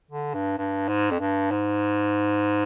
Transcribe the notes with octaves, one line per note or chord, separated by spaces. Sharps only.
D3
G2
G2
G#2
F2
G2
G#2